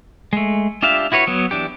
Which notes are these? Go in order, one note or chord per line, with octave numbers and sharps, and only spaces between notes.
G#3 A3
D4 F4 G4 E5 F5
E4 F#4 B4 C#5
F#3 B3
E3 D4 G4